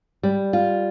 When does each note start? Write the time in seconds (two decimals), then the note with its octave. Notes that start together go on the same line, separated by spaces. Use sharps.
0.23 G3
0.53 F4